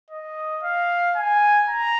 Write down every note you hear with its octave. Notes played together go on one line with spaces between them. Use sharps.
D#5
F5
G#5
A#5